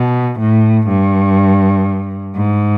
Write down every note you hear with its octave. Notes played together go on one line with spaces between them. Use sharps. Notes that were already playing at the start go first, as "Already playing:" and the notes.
Already playing: B2
A2
G2
G#2